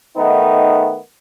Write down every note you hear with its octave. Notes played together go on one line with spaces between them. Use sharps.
D#3 A3 B3 D#4